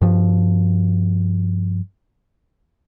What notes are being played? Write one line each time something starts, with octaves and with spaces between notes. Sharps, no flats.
G2 F3